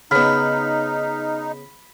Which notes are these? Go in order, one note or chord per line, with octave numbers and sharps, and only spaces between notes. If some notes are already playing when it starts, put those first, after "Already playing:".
C#3 B3 D#4 B5 F6